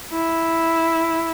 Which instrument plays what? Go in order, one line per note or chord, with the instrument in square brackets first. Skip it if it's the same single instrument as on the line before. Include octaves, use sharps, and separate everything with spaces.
[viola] E4